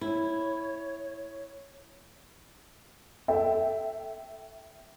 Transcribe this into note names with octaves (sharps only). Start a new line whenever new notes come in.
E4 C#5
A4 E5 G5